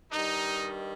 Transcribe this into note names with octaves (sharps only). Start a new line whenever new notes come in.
G2 D#3 G3 D#4